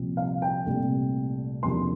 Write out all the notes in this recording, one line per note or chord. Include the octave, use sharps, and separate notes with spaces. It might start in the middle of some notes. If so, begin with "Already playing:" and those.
Already playing: C2 A#2 F3 C4
F5
G5
C2 A#2 A3
E2 C3 F3 A#3 D4 C6